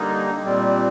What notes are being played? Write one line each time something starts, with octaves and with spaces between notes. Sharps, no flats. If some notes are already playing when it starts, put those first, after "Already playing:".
Already playing: D3 G3 A#3 D#4
A#2 G3 C4